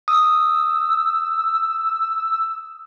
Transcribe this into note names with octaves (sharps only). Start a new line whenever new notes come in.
D#6 E6